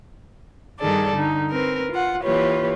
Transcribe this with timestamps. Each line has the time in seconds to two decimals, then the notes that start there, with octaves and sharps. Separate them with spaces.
0.79 G2 D#3 G3 G#4 A4 D5
1.14 D3 D#4
1.51 C4 A#4 B4
1.90 F4 F#5
2.21 E3 A#3 F4 G4 B4 C#5